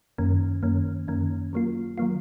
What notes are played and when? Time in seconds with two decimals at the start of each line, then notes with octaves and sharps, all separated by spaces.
0.18 F#2 D#3 A#3 C#4
0.63 F#2 D#3 A#3 C#4
1.08 F#2 D#3 A#3 C#4
1.53 D#3 F#3 A#3 F4
1.98 D#3 F#3 A#3 F4